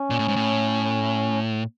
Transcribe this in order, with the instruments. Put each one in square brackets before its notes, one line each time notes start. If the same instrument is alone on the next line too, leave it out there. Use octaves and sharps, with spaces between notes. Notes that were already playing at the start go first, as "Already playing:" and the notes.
Already playing: [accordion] C#4
[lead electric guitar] A#2
A2
G#2
A2